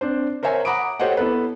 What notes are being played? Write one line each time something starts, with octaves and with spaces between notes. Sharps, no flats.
C4 D4 C5
A#4 C5 C#5 E5 G#5 A#5
F#5 A#5 B5 D6 D#6 D7
G4 A4 C5 C#5 D#5 F#5
B3 E4 A4 B4